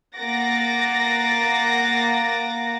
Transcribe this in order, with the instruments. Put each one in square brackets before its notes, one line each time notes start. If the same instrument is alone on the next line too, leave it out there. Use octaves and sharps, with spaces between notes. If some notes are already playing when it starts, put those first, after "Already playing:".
[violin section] A#3 F#5 D6 A6 A#6